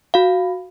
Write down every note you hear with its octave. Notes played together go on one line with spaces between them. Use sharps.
F#4 F5